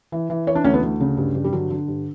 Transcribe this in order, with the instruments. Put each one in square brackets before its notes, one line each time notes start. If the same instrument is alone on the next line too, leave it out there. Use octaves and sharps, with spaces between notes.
[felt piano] E3
E3
E3 C#5
D4
D2 C#4
B3
D2
C#3
G2
G2
G3
D3 F#3
D3
G2